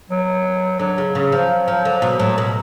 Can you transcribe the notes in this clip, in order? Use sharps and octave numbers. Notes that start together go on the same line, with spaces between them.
F#3
D3 F#3
C#3
C#3
F3
F3
D3
B2
A2 F#3
B2